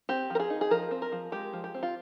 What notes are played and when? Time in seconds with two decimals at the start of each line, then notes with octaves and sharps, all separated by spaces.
0.09 C4 G4
0.30 F3 A#4
0.40 G#4
0.50 D#4
0.61 G#4
0.71 F3 A#4
0.91 C4
1.02 A#4
1.12 F3
1.32 G#3 G4
1.53 F3
1.64 G4
1.74 C4
1.83 F4